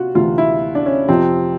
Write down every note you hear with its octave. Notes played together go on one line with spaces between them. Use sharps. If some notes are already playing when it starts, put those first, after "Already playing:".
Already playing: C3 F4 F#4
D2 C3 E3 F4
E4
D4
C#4
F2 C3 F3 C4